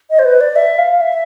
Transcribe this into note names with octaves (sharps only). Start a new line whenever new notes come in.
D#5
C5
B4
D5
E5
F5
E5